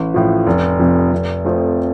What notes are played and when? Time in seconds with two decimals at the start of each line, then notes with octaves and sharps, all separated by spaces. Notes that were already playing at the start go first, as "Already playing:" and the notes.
Already playing: A1
0.14 A2 F3
0.47 F1
0.79 F2 C3
1.12 F1
1.45 F2 F3 A3 C4